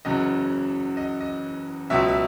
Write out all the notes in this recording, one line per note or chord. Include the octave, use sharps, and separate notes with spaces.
F#1 E2 C#3 F#3 D#5
D#5
D#5
C#2 B2 F#3 E5
E5